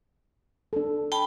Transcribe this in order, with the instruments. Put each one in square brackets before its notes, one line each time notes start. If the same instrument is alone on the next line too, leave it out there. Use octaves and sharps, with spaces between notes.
[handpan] D4 A4
[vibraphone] G5 A5 B5